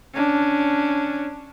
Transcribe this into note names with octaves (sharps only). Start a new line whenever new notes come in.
C#4 D4